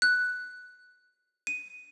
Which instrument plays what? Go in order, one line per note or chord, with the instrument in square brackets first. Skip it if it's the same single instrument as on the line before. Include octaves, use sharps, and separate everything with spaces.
[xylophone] F#6
D#7